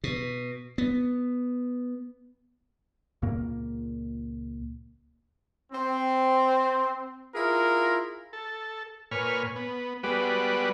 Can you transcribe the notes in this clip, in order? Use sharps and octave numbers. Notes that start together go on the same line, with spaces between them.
B2
B3
C#2 A#2 A#3
C4
E4 F4 G#4 A#4
A4
A#2 B4 C#5 G#5 F6
B3
G3 G#3 B3 F#4 B4 D5